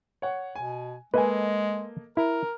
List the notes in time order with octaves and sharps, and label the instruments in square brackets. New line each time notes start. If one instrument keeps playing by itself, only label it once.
[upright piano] C#5 F#5
[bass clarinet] B2 [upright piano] G#5
[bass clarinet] G#3 [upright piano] A#3 A4 D#5 [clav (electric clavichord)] B4 G#5
[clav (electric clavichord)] E4 [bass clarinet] A#4